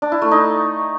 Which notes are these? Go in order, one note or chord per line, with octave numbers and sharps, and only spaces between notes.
D4
E4
A3
D#4